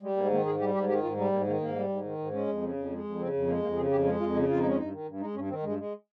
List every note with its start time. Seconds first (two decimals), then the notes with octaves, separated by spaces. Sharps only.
0.02 G3 G#3
0.17 G#2 A#3
0.30 D#3 A#3
0.46 G#2 G#4
0.60 G3 G4
0.74 G#2 G4
0.88 D#3 G4
1.03 G#2 F4
1.17 G3 D#4
1.32 G#2 A#3
1.41 G#3
1.46 D#3 A#3
1.61 G#2 A#3
1.75 G3
1.89 G#2
2.04 D#3
2.18 G#2
2.32 G#3 C#4
2.47 F2
2.62 C#3
2.76 F2
2.90 G#3
3.04 F2
3.19 C#3 C4
3.33 F2
3.48 G#3 A#3
3.62 F2 A#3
3.76 C#3 G#4
3.90 F2 G4
4.05 G#3 F4
4.20 F2 F4
4.34 C#3 D#4
4.49 F2 F4
4.58 D#4
4.63 G#3 C#4
4.76 G2 D#4
4.92 D#3
5.07 G2
5.20 G#3 D#4
5.34 G2 C#4
5.49 D#3 C4
5.63 G2 G#3
5.78 G#3